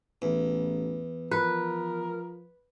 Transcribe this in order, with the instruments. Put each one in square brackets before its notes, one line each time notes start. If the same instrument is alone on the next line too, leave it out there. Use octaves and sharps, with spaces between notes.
[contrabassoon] A1 [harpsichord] E2
[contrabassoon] F3 [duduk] A#4 [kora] B4